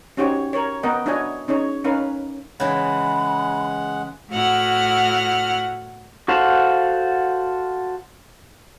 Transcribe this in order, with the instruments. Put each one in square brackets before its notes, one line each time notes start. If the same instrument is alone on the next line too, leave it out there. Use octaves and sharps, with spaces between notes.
[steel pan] C#4 D#4 F#4 G4 C5 C#5
A#4 C#5
B3 A#4 D#5 F#5 G5
D4 E4 F#4 C#5 D#5 G#5
C#4 D#4 G#4 C#5
C#4 D#4 A#4 B4 F5
[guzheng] C#3 E3 [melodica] G#3 F#5 [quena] B5
[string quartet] A2 E4 F#4 F#5 F6
[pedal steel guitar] F#4 A4 C5 F5 F#5